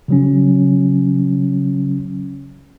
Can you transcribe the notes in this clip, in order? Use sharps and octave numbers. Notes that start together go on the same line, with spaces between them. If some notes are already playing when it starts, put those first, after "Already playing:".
C#3 F#3 C#4